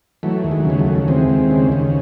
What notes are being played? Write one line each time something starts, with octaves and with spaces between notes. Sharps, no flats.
E3 F#3 A3
D#2
G#3
F#3
C#3 G#3
F#3 A3
D#2
E3 G#3 C4
D#2
C#3
D#2